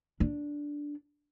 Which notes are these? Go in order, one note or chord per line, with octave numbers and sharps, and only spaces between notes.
D4